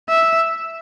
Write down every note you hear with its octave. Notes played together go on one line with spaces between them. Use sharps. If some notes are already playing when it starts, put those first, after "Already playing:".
E5